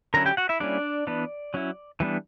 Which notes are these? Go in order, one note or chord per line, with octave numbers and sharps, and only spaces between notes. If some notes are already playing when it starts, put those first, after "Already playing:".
D3 F#3 C#4 E4 A#4 A#5
G4 G5
F#4 F#5
E4 E5
G3 A#3 C#4 D4 E4 D5
E3 B3 D4
F#3 C#4 E4
E3 G3 B3 D4